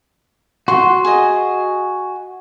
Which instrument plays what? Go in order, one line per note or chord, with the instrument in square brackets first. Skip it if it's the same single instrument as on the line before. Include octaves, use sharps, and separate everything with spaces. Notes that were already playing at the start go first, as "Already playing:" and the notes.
[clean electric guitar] F#4 [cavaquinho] C6
[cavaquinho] G#4 D#5